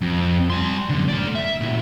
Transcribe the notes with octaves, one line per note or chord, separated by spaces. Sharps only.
F2
G3 C6
F#2 D3
A3 D5
E5
A#2 E3